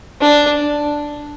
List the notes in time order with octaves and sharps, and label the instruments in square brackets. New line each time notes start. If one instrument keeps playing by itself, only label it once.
[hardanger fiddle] D4